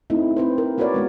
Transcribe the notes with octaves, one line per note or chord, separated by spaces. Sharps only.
A3 C4 D#4 E4
C4 B4 C5
A#4
A#3 F#4 A#4 B4 C#5 D5
G#3 B3 F#4